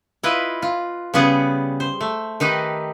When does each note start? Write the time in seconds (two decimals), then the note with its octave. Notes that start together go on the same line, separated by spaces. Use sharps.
0.23 E4 F4 B4 D#5
0.62 F4
1.14 C#3 G3 B3 G#4 F#5
1.80 C5
2.01 A3
2.40 D#3 D#4 G4 B4